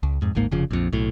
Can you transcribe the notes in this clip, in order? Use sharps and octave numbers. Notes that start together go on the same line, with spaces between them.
C#2
F2 G#2
D1 G#1 G#2 A#3
F1 C#3 F3
A#1 F2
B1 A2